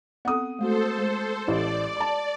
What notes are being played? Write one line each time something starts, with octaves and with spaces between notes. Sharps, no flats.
B3 C4 A4 F#5 D#6
G#3 A3 F#4 A4 C5
G#3
A1 G4 D5 D#5
A5 D6